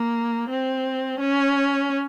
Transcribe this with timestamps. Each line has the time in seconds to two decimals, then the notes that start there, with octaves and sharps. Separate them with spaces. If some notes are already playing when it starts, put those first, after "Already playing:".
Already playing: A#3
0.49 C4
1.20 C#4